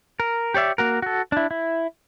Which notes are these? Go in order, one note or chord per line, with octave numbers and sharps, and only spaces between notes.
A#4
G4 C#5 D5 E5
A#3 F#4 A#4
F#4 A4
D4 E4
E4